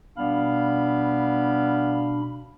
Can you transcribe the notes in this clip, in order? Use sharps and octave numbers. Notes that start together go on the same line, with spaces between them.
B2 G3 B3 D4 F5 B5